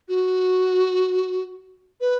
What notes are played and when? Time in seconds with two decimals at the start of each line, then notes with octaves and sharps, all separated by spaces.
0.09 F#4
2.01 B4